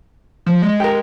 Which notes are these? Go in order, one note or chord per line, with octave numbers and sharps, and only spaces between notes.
F3
G#3
G4 A#4